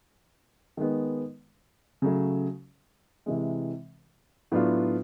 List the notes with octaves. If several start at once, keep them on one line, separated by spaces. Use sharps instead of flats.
D#3 G#3 B3
C#3 F#3 A3
C3 E3 G#3
A2 F#3 B3 D4 F4